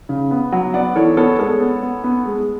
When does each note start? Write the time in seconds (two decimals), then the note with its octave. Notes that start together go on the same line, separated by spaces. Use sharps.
0.09 C#3
0.31 B3
0.52 F#3
0.74 B3 D5 F#5
0.95 E3 A4 C#5
1.17 B3 A4 C#5
1.39 G#3 A4 C#5
1.61 B3
1.83 B3
2.04 B3
2.26 G#3